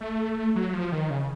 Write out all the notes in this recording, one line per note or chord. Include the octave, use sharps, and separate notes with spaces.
A3
F#3
F3
D#3
C#3